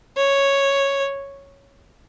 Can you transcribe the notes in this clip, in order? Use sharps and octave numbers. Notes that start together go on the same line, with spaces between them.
C#5